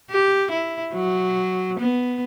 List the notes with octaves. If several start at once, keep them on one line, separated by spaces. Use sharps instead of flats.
G4
E4
F#3
B3